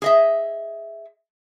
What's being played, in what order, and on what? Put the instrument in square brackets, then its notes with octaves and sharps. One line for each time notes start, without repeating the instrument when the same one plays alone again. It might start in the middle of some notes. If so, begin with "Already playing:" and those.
[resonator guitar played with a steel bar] G#4 D#5 E5